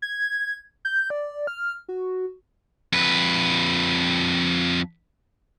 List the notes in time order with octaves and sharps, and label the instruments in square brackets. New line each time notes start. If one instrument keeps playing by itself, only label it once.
[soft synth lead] G#6
G6
D5
F6
F#4
[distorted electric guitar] F2 B4